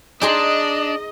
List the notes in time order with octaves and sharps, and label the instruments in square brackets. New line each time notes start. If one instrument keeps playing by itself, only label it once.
[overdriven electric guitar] D4 [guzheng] D#4 G#4 C6 [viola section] D#5